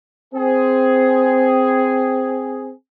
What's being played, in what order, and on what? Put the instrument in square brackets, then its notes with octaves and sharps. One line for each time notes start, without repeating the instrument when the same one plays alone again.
[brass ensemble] C4 G#4